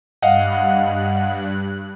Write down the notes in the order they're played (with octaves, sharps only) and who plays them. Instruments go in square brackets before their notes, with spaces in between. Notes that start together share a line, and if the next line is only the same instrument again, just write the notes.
[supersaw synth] G2 F#6 [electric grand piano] D#5 F5 F#5